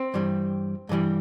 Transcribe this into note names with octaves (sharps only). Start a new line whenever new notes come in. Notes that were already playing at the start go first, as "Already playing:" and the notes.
Already playing: C4
G2 E3 G3
G2 E3 G3